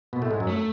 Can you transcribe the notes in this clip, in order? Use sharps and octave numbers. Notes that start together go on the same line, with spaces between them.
B2 B3
A2 A3
G#2 G#3
F#2 F#3
A3